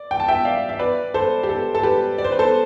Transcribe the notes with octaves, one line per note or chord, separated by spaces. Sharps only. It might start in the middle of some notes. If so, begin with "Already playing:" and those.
Already playing: D5
G5
A5
E5 G5
D5 F5
E5
B4 D5
A4 C5
G4
A4
A4
G4 B4
D5
C5
B4
A4 C5